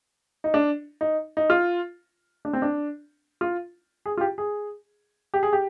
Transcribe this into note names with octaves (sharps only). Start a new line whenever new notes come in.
D#4
D4
D#4
D#4
F4
D4
C4
D4
F4
G#4
F4
G4
G#4
G4
G#4
G4